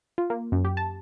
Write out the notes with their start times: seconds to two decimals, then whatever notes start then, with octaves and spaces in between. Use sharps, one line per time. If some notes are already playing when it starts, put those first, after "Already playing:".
0.18 F4
0.30 A#3
0.52 F#2
0.65 G4
0.77 A5